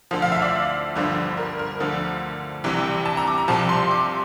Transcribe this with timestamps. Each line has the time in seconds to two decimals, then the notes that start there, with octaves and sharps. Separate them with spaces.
0.11 D2 D3 F3
0.22 F5
0.32 E5
0.42 D5
0.96 G1 G2 D3 F3
1.37 A#4
1.59 A#4
1.80 D2 D3 F3
2.64 C2 C3 E3
3.05 A5
3.17 A#5
3.27 D6
3.38 A#5
3.48 C2 C3 F3 A5
3.69 C6
3.91 D6